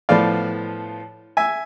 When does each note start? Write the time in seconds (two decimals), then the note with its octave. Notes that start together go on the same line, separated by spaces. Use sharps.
0.09 A2 F3 B3 D5 F5
1.37 E5 G#5